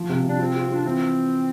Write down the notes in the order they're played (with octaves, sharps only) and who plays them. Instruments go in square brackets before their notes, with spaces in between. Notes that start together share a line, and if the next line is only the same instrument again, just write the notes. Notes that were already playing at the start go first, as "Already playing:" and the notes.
Already playing: [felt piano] F3
C3
[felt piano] C3 [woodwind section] D4
[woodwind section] C4 [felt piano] F4
[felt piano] F4
[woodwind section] D4 [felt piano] F4
[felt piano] E3 [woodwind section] C4